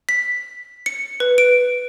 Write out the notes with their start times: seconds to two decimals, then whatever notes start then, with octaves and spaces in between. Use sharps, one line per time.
0.09 B6
0.86 C#7
1.20 B4
1.38 D7